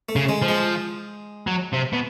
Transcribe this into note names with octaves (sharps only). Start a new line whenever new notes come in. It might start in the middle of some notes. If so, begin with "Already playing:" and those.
A3
C#3
G#3
F3
G#3
F#3
C3
B2